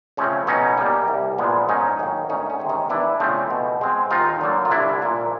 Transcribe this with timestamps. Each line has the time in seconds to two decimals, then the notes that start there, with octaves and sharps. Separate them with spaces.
0.17 C#3 F3 A3 C4 C#4
0.47 B2 C#4 D#4
0.78 G3 A#3
1.08 C2
1.38 A#2 F3 G#3 B3
1.69 G#2 C#4 D#4
1.99 D#3 F#3 A#3
2.29 D2 C#4 D#4
2.50 C#4
2.59 C3 D#3 G#3
2.69 C#4 D#4
2.89 E2 D4 E4
3.20 C#3 F3 A3 C4
3.50 B2
3.81 G#3 C4
4.11 D#2 D#4 F4
4.41 D3 F#3 A#3
4.65 F4
4.71 C2 D4 E4
5.02 A#2 F3 A#3